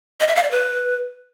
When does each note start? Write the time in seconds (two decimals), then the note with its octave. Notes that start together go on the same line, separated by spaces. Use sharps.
0.20 D#5
0.28 E5
0.36 F5
0.43 D5
0.51 B4